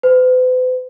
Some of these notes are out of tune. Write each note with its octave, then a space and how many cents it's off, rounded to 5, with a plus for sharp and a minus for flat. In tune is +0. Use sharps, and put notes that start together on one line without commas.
B4 +45